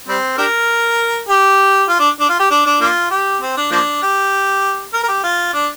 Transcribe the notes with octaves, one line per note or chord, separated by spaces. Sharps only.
G3 C4
D4 G4 A#4
G4
F4
D4
D4
F4
G4
D4
D4
A#3 D4 F4
G4
C4
D4
F3 A#3 D4
G4
A#4
A#4
G4
F4
D4